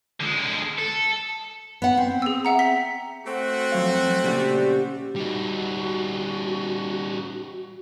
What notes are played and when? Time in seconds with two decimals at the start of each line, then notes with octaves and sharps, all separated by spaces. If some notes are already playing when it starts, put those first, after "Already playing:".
0.21 D3 G#3
0.79 A4
1.82 B3 F#5
1.97 C4
2.22 G#4 E6
2.45 E5 F#5 A#5
2.59 B6
3.26 A3 C4 F#4
3.72 F2 F#3 F5
4.24 A#2 C#3 G3
5.16 G3 D#4 F#4